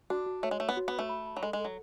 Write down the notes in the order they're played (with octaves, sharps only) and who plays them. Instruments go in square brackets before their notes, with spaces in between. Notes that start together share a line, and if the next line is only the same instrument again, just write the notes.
[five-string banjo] D4 [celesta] F#4
[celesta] F#4
[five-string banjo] A3 [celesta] C#5
[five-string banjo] G#3
[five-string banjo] A3 [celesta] C#5
[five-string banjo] B3
[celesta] F#4
[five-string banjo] B3
[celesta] B5
[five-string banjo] A3
[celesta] B5
B5
[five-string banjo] F#3
[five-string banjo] G#3 [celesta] A4
[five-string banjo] G#3
[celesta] A4
[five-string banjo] F#3